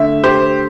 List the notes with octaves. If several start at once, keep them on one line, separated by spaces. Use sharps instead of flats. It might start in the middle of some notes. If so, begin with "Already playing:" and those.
Already playing: D3 A3 E5
G4 C5